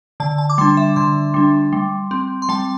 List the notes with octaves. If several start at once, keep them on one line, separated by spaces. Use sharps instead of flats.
D3 A5
A5
D6
G3 D4 C6
E5
D3 C6
G3 D4
G3
C4
C6
G3 A5